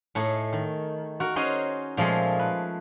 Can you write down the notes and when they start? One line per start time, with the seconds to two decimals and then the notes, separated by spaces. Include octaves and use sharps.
0.15 A2 A3 D#4 G#4
0.53 D#3
1.20 F#4 A#4
1.36 C#4 D#4 F#4 G#4 C5 D#5
1.97 A#2 F3 G#3 A3 G#4
2.39 B4